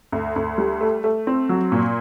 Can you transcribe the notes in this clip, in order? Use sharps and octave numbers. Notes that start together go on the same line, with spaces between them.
D2
D2
G3
A3
A3
C4
F#3
A#2